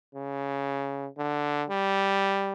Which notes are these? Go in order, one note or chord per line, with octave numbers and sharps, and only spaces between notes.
C#3
D3
G3